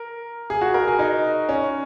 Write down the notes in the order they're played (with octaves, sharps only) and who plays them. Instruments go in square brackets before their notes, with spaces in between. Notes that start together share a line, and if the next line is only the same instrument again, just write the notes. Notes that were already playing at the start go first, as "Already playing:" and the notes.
Already playing: [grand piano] A#4
G#4
F#4
A#4
G#4
D#4
C#4